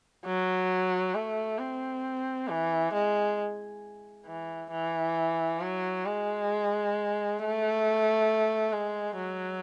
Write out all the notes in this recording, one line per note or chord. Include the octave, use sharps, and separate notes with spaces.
F#3
A3
C4
E3
G#3
E3
E3
F#3
G#3
A3
G#3
F#3